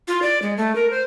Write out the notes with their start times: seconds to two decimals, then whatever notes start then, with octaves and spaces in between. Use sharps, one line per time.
0.08 F4
0.22 D5
0.42 G#3
0.57 A3
0.75 A#4
0.91 C5